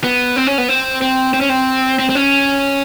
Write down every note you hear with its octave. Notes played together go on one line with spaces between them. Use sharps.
B3
C4
C#4
B3
C4
C4
C4
C#4
C4
C4
C4
C#4